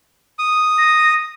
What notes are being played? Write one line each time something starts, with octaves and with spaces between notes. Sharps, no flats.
D#6
A#6